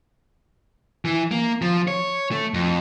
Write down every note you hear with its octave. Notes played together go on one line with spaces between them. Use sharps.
E3
A#3
F3
C#5
A3
F2